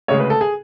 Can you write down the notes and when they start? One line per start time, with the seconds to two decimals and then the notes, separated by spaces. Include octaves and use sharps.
0.08 D2 C#3 G#3 C#5
0.19 B4
0.30 A4
0.41 G#4